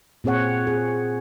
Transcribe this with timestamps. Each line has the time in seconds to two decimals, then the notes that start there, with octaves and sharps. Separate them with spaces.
0.24 A#2 C4 G#4 C#5 F#5
0.67 G#4